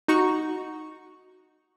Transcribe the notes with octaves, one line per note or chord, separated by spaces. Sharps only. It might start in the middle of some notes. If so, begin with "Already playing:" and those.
D#4 F#4 C#6